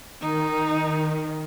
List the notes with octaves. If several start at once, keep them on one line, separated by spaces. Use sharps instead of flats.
D#3 D#4